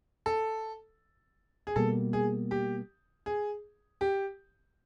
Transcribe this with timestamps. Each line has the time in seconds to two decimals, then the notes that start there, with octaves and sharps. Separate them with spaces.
0.26 A4
1.67 G#4
1.76 B2 G3 A#3 A4
2.13 G#4
2.51 G4
3.26 G#4
4.01 G4